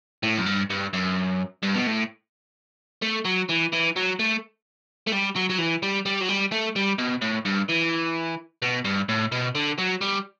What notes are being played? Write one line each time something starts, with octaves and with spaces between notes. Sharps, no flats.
A2
F#2
G2
G2
F#2
G2
B2
A2
A3
F#3
E3
E3
F#3
A3
A3
G3
F#3
F#3
E3
G3
G3
F#3
G3
A3
G3
B2
A2
G2
E3
B2
G2
A2
B2
D3
F#3
G3